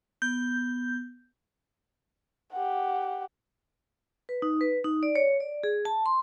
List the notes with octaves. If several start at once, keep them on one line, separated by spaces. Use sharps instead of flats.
B3 G6
G4 F#5
B4
D#4
B4
D#4
D5
C#5
D5
G#4
A5
C6